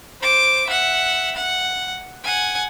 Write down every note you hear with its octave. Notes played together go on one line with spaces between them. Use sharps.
C5 D6
E5 F#5
F#5
F#5 G#5